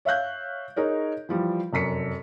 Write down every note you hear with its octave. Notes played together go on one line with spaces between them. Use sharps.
C#5 E5 F5 F#6 G6
D#4 G#4 A#4 C#5
E3 F3 G3
F1 F#2 B6 C#7